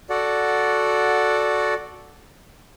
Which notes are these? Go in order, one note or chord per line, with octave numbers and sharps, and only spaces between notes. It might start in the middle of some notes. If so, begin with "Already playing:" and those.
F#4 A4 D5 F#5